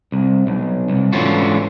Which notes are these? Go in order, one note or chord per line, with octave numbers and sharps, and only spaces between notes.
C2
B1
C2
G#2 D3 E3 C#4 F4 F#4